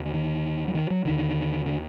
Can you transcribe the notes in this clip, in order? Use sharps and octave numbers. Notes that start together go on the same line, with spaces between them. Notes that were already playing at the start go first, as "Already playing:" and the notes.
Already playing: D#2 D3
D#3
F#3
D#3
F#3
D#2 D3 D#3
D3